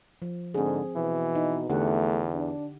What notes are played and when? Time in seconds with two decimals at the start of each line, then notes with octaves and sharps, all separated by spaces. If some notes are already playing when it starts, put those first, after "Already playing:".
0.22 F3
0.54 G#2 D3 C4 G#4
0.96 B2 E3
1.35 D#4
1.70 E2 D3 A3 G4 F#5
2.35 D4